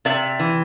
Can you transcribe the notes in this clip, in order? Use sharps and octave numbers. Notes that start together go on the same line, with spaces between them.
C3 D5 E5
E3